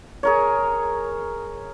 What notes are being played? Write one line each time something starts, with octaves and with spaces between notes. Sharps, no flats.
G#4 A#4 C#5